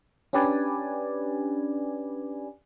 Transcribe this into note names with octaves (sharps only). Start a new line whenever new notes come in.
C#4 D4 G4 B4 D5 G#5